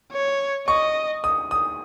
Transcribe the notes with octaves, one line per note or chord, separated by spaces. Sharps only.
C#5
D#5 C#6
D#6
D#6